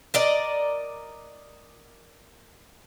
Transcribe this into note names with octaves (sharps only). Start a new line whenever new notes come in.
A#4 D5 D#5